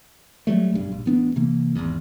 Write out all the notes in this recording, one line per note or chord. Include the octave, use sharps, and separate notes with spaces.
F#3 G3 A3
F#1 B1 G2
A#1
A1 B3 D4
C3 E3 A#3
G#1 E2